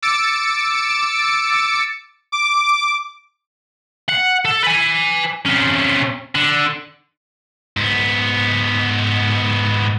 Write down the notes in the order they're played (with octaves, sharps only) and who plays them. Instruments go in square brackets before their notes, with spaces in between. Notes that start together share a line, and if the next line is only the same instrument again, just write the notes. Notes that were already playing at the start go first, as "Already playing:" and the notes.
[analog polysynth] D6 E6 A6 C#7 D7
[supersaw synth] D6
[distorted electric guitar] F#5
A4
B4 G#5
C3 C#4
D3
G#2 B3